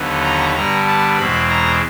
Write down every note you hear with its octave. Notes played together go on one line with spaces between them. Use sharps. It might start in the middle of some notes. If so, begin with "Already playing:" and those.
Already playing: D#2 D3 F#3 B3 D#4
A#5
G2 D3 G3 B3 A#5
A5
E2 B2 G#3 C4 B5
A#5